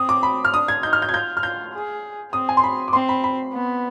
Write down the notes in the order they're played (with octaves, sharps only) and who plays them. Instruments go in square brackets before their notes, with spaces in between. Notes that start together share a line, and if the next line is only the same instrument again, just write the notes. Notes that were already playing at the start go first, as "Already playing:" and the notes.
Already playing: [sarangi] C4 [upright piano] D#6
[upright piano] D6
B5
F6
[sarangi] D4 [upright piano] D#6
[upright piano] G#6
[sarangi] D#4 [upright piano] G6
[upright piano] F6
G6
G#6
[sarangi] F4 [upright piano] G6
[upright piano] F6
[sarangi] F4 [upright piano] G6
[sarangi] G#4
[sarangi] C4 [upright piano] D#6
[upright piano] G#5
C6
B5
D6
[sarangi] C4 [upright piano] C6
[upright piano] B5
B5
[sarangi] B3